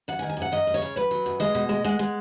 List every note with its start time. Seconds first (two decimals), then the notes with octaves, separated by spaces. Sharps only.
0.08 F#2 F#5
0.19 G#5
0.22 D#3
0.29 G#5
0.37 F#2 F#5
0.52 F#2 D#5
0.67 F#2
0.74 C#5
0.82 C#3
0.96 F#2 B4
1.11 F#3
1.26 F#2
1.40 G#3 D#5
1.55 B2
1.69 G#3
1.84 G#3 F#5
1.99 G#3